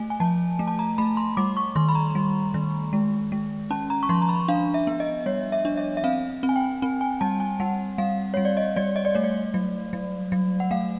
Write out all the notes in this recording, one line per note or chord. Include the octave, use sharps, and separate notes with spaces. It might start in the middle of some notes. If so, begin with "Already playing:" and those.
Already playing: A3 G#5
G#5
F3 A5
A3
A5
A#5
A3 B5
C6
G3 D6
C#6
D#3 C6
B5
A#5
G3
D#3
G#3
G#3
C#4 A5
A#5
C#6
F3 C6
A#5
B5
D4 F5
E5
B3
D#5
G3 C#5
E5
D4
E5
E5
C4 F5
C4
G#5
G5
C4
G#5
G3 A5
G#5
G3 F#5
G3 F5
G3 C#5
D5
D#5
G3 D5
D#5
D5
A3 C#5
D5
F#3
F#3
F#3
F#5
A3 F5